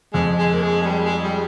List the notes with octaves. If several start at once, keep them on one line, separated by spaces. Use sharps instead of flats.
F2 G#3
G#3
A#3
G#3
G#3
G3
G#3
G3